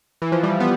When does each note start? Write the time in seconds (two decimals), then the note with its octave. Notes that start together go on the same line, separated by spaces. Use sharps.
0.22 E3
0.32 F3
0.43 G3
0.60 B3